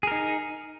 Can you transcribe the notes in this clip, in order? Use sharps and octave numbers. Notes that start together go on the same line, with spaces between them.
D#4 G#4 A#4